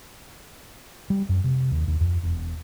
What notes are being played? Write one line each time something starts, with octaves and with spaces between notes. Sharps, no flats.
G3
F#2
C3
D#2
D#2
F2
E1